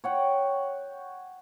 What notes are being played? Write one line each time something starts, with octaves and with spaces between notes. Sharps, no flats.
C#5 F#5 G5